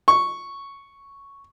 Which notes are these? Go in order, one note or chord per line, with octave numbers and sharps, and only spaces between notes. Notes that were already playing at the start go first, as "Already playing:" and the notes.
C#6